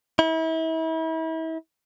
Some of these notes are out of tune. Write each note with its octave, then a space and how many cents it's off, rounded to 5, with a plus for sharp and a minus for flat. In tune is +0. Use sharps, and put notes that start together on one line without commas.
E4 -35